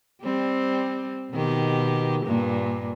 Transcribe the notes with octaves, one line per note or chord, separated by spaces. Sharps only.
G3 C4
B2 D#3 G4
G2 A#2 A#3